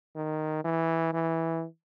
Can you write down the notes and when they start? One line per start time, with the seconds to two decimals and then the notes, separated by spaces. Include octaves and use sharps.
0.16 D#3
0.64 E3
1.13 E3